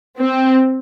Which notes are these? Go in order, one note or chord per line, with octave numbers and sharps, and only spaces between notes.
C4